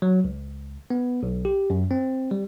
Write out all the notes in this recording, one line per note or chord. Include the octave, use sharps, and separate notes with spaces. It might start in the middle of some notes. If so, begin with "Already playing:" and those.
F#3
C#2
B3
B1
G4
F#2
C4
G3